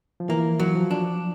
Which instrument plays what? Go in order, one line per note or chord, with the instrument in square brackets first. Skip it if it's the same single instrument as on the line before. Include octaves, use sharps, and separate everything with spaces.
[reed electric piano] F3
[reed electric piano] E3 [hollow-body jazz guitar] A#3
[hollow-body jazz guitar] F#3
[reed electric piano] F3
[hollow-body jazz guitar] D4